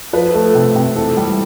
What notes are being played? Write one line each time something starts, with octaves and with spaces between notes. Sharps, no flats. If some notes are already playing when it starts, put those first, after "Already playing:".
F3 B4
A3
C3
C3
E3 A4
G3